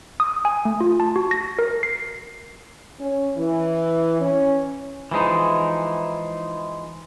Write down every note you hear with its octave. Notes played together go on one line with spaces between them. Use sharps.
D#6
G#5
A3
F4
A5
F#4
A#6
A#4
C7
C#4
E3
C#4
E3 F3 G#3 D#4